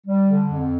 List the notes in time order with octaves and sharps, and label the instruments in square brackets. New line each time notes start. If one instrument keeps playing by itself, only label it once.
[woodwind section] G3
D3
F2